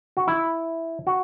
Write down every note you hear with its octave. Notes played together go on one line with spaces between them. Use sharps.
F#4
E4
F#4